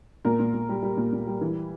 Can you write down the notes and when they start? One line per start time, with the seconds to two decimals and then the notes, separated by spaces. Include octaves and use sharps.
0.25 A#2 A#4
0.39 A#2
0.54 A#2
0.69 G3
0.83 G3
0.97 A#2
1.13 A#2
1.27 G3
1.41 E3